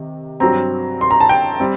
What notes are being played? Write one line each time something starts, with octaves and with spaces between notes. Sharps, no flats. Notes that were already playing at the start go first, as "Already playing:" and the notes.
Already playing: C3 D#3
G2 F#3 C4 A#5
C6
A#5
A5
G5
G3 C4